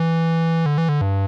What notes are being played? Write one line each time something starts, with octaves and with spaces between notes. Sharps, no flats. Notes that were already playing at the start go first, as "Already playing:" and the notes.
Already playing: E3
D3
E3
D3
G2